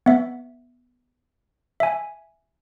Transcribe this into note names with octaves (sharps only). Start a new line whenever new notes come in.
B3 E5
E5 G#5